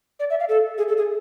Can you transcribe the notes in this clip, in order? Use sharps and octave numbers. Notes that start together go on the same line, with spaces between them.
D5
E5
F5
A4
G#4
A4
G#4